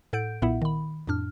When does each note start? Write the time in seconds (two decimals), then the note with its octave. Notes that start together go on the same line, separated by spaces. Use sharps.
0.13 A2 A4 F#5 G6 D7
0.42 B1 A#2 B3 E4 E5 F#5
0.62 D#3 B5
1.07 F2 A2 D4 F6